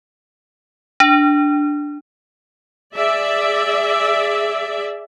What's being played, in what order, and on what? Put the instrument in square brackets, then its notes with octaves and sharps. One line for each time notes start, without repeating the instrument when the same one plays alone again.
[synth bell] D4
[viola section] G#4 D5 E5